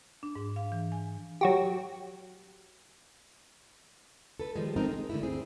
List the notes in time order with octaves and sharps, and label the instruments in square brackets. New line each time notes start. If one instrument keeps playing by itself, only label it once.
[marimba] D4
G#2
F5
E3
G#5
[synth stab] F#3 F#4 G4
[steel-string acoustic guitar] A4 B4
D#3 F3 G3 G#3
C4 D#4 A4 A#4
G#3
D3 A3 E4
D2 G2 C4 G#4